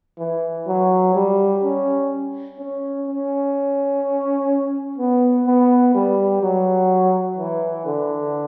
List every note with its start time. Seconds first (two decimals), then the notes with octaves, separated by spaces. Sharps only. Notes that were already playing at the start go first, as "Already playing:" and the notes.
0.19 E3
0.67 F#3
1.15 G3
1.63 C#4
2.59 C#4
3.07 C#4
4.98 B3
5.47 B3
5.95 G3
6.42 F#3
7.38 E3
7.86 D3